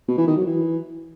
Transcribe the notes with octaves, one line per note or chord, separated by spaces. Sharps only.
B2
E3
D#3
F#3
E3